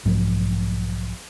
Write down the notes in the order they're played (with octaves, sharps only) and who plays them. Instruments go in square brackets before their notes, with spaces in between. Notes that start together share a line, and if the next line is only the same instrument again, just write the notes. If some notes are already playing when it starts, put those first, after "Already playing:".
[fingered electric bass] B1 G#2 F3 F#3